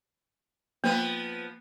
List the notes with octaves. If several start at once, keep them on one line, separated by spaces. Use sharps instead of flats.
F3 A#3 B3 B4